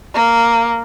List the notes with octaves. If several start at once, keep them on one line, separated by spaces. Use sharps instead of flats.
A#3